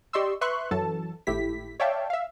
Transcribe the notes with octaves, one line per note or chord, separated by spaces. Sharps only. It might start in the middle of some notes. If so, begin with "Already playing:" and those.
G4 D5 D#5 C6 C#6 E6
B4 E5 C6 C#6 F#6
F#2 E3 F#3 A4 A5
G#1 A2 A3 E4 G4 B6
C#5 D5 E5 F5 G5 A5
E5 F5